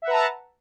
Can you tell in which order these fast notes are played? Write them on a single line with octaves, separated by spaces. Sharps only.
E5 F#5 B4 A#5 A5